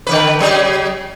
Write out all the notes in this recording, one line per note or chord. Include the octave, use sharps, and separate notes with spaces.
D3 D#3 B4
C#3 F#3 G#4